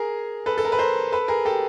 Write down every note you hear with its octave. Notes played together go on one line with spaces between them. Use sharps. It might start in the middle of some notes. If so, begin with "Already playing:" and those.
Already playing: G#4 A#4
A4 B4
A4
A#4
B4
A#4 C5
A4 B4
G#4 A#4
G4 A4